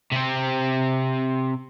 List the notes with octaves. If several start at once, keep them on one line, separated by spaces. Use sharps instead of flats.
C3 C4